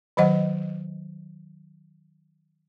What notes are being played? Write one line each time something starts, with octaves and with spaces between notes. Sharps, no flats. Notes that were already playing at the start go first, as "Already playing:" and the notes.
D#3 F#3 C5 D#5 F#5